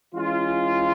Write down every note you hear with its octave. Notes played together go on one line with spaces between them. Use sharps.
E3 G#3 C#4 F4